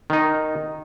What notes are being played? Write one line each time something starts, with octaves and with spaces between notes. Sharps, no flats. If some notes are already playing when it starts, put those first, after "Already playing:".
D#3 D#4